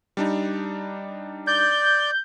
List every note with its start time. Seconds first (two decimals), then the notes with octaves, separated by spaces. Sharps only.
0.17 G3 D4 D#4
1.47 D5 G6